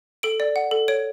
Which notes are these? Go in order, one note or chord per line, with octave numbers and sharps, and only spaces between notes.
A4 D7
D5
F#5
A4
C#5 D7